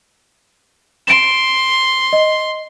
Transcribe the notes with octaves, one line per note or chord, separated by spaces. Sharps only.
C6 D7 E7
D#5